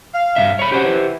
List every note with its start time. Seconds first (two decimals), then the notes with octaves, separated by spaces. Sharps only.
0.14 F5
0.36 G2 B2 E5
0.59 C#5 B5
0.72 F#3 C4 C#4 G4 C5 F#5
0.85 E3